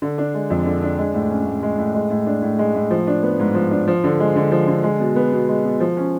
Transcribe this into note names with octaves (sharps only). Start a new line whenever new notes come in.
D3
D4
G#3
F2
D3
D4
G#3
A2
C#4
A2
G#3
A2
G#3
A2
D4
A2
G#3
A2
F3
D4
B3
G#2
F3
D4
F3
D3
G#3
D3
F3
D3
G#3
B2
B3
B2
G#3
B2
F3
C#4